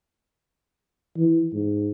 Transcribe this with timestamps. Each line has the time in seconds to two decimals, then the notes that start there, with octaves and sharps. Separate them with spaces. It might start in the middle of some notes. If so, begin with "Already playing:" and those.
1.18 E3
1.53 G#2